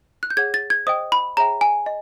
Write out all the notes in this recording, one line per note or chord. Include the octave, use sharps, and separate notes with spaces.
F#6
G6
G#4 C#5 F#5 G#6
A6
G#6
C5 D#5 G5 D#6
B5
G#4 C#5 E5 G5 A#5
G#5
D#5